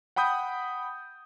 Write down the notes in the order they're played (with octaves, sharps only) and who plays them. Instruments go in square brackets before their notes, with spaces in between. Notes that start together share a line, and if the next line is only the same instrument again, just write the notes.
[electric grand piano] F#5 G5 B5 D#6 G6